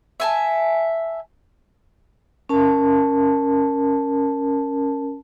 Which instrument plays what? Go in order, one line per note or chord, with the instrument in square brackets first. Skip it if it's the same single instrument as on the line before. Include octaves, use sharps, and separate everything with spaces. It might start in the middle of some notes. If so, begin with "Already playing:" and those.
[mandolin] E5 G#5 A5
[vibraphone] C#4 A#4 A5